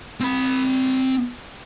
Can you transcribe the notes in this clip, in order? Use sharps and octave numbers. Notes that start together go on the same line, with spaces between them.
C4 B5